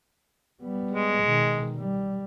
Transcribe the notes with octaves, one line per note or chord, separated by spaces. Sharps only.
G3 B3
G#3
B2 D#3
G3